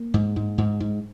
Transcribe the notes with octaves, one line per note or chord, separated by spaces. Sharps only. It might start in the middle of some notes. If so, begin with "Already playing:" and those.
Already playing: A#3
G#2
G#2
G#2
G#2